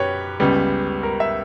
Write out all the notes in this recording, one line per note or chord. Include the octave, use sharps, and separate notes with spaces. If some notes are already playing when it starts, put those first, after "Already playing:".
Already playing: F#2 G4 B4 C#5
C#2 C#3 G3 B3
A#4
E5